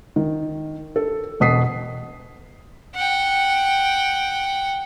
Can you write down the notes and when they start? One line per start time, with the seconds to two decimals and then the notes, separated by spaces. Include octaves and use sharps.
0.16 D#3
0.96 A4
1.40 E1 B2 D#6 B6 C7
2.95 F#5 G5